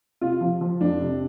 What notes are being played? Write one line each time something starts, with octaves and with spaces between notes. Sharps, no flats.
C3 F4
F3
F3
F2 D4
C3